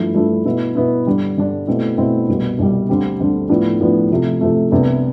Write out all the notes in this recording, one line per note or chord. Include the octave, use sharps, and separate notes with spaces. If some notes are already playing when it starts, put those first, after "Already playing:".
Already playing: G2 F3 A3 E4
G2 F3 A3 E4
B2 B3 E4
B2 B3 E4
G2 D3 G3 D4
G2 D3 G3 D4
B2 A3 C4 E4
B2 A3 C4 E4
C2 B2 G3
C2 B2 G3
D2 D3 G3 C4
D2 D3 G3 C4
A2 F3 B3 D4
A2 F3 B3 D4
C3 F3 A3
C3 F3 A3
C2 C3 G3 B3 D4